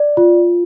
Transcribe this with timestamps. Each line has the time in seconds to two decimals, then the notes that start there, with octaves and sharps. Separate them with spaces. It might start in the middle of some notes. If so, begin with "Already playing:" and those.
Already playing: D5
0.17 F4